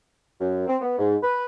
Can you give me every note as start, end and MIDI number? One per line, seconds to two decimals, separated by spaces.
0.40 0.66 42
0.68 0.77 60
0.82 0.95 59
0.98 1.16 44
1.22 1.46 71